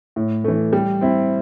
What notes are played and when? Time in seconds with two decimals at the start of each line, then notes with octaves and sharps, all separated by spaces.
0.16 A2
0.44 E3 A3
0.73 G3
1.01 C4 E4